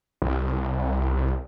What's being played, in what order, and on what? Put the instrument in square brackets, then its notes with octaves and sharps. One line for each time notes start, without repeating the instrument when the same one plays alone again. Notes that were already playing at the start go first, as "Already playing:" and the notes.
[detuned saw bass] C2